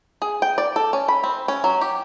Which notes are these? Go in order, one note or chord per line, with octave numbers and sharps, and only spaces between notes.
G#4
G5
D5
A4
C#4
B5
C4
C#4
F#3
G4